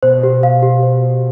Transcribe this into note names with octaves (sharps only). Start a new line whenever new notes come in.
B2 C5
G4
F5
G4
C5
G4